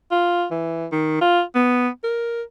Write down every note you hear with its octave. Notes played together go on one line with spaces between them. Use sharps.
F4
E3
D#3
F4
B3
A#4